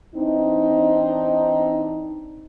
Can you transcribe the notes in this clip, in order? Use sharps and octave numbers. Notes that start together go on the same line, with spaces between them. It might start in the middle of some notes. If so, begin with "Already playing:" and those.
E3 C4 D4 D#4